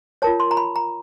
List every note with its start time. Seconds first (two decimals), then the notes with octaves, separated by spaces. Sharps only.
0.22 F4 A#4 C#5 A5
0.40 C6
0.51 A#5
0.57 B5
0.76 A#5